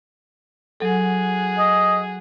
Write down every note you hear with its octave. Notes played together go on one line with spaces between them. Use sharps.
F#3 F#4 G#4 A4
D#5